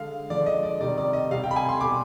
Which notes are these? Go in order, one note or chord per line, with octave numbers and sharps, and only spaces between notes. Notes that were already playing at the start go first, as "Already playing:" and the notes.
Already playing: D3 G#3 F5
D3 F3 G#3 D5
D#5
D5
C3 D#3 G3 D5
D5
D#5
C3 G3 F5
G5
B5
G#5
C6
B2 G3 D6